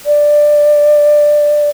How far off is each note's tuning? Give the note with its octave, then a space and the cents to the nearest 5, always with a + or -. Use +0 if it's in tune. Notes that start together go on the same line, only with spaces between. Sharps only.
D5 +10